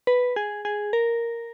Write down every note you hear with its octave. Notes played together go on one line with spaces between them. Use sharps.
B4
G#4
G#4
A#4